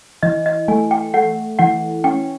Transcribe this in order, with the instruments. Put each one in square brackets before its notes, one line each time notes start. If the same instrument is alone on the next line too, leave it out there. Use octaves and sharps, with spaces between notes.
[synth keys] E3 [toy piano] D#5
[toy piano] D#5
[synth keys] A3 [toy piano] G#5
[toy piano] G5
[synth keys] A3 [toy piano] F#5
[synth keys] E3 [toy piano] F#5
[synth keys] C#4 [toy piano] G5